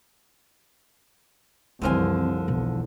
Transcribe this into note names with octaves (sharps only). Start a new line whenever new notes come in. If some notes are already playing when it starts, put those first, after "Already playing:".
C2 F#2 D3 E3 F3 C4 G#5
B1 E2